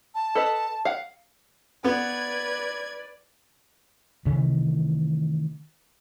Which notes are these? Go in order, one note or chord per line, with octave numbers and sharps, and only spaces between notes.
A5
A4 B4 D#5
F5 F#5
B3 B4 D5 G#6
C3 D#3 E3 A3